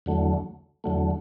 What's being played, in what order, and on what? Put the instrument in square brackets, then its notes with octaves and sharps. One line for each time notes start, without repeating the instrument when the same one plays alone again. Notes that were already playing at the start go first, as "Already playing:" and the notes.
[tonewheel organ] E2 D3 F#3 A3
E2 D3 F#3 A3